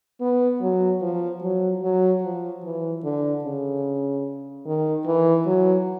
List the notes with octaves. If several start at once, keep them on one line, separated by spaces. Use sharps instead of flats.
B3
F#3
F3
F#3
F#3
F3
E3
D3
C#3
D#3
E3
F#3